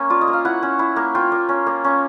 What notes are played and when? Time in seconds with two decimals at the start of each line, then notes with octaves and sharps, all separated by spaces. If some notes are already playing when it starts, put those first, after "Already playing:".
Already playing: A#3 C#4
0.10 F4 D5
0.21 D#5
0.27 A#3
0.33 F5
0.45 E4 F#5
0.62 C#4
0.79 E4
0.96 A#3
1.15 F4 G5
1.32 A#3
1.49 C#4
1.66 A#3
1.84 C#4